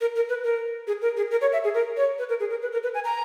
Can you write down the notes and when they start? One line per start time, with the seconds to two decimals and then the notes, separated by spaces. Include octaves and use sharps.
0.01 A#4
0.15 A#4
0.29 B4
0.44 A#4
0.87 G#4
1.02 A#4
1.17 G#4
1.31 A#4
1.41 C#5
1.53 E5
1.64 G#4
1.74 A#4
1.97 C#5
2.19 B4
2.29 A#4
2.40 G#4
2.50 A#4
2.62 B4
2.72 A#4
2.83 B4
2.94 G#5
3.05 A#5